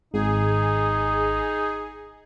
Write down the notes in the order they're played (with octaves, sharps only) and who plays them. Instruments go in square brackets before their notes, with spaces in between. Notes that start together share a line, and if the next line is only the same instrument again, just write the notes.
[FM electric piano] G#1 [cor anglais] D#4 [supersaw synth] G#4